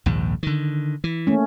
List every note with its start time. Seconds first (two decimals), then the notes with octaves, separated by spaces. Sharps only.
0.06 A#1 D#2 G#2
0.43 D3 D#3
1.04 E3
1.27 A3 A#3 C#4